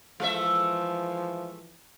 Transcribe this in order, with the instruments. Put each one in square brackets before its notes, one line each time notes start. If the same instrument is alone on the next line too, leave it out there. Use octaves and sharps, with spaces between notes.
[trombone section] E3 F3 [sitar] G#3 A3 E5